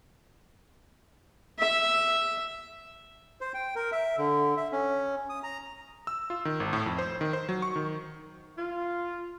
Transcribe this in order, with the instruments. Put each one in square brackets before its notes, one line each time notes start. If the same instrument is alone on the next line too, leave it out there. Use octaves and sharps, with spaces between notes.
[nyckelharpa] E5
[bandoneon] C5
G5
A#4
E5
D3
E5
C#4
D#6
A#5
[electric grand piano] E6
F4
D#3
G#1
A2
F2
C5
D#3
C5
F#3
C#6
D#3
[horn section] F4